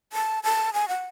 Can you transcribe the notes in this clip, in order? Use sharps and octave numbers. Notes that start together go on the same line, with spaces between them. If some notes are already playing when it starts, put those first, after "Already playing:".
A5
A5
G#5
F#5